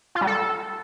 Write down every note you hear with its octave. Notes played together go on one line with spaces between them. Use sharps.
F4
G3
A4